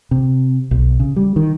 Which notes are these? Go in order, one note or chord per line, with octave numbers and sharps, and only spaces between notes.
C3
B1
C#3
G3
D#3